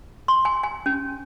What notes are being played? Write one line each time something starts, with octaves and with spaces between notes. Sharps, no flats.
C6
G#5
G#5
C#4